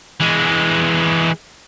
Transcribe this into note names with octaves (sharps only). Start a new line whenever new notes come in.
E3 G#3